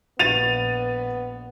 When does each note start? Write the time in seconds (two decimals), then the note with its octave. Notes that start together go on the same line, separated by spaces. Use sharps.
0.19 A#1 B3 A6 D#7 F7